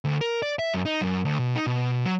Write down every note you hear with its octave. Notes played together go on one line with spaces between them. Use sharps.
D2
A#4
D5
E5
F#2
D#4
F#2
D2
B2
D#4
B2
F#3